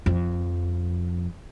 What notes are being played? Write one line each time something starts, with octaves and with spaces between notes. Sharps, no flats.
F2